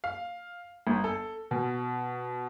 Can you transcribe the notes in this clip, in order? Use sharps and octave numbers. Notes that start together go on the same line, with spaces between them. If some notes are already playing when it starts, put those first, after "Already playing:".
F5
G1
A4
B2